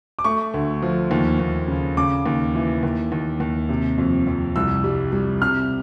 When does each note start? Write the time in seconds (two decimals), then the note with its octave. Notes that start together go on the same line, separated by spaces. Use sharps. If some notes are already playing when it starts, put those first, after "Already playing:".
0.19 D6
0.24 A3 C#6
0.54 D2
0.82 F3
1.11 D#2
1.39 D#2
1.68 C#3
1.97 C#3 D6
2.26 D#2
2.55 E3
2.83 D#2
3.12 D#2
3.40 D#2
3.69 C3
3.98 F2
4.27 F2
4.56 C2 E6
4.84 G3
5.13 G3
5.42 C3 F6